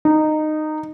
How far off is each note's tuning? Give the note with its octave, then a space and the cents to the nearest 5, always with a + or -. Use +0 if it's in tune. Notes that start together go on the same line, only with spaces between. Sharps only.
D#4 -15